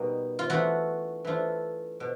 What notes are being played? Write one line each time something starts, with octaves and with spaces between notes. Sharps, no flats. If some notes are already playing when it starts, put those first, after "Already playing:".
Already playing: B2 G3 A#3 D#4
F4
E3 A3 D4 F4 F#4
E3 A3 D4 F4
B2